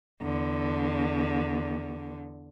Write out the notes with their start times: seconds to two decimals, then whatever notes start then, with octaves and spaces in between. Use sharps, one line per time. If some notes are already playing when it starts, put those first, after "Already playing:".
0.22 E2 D3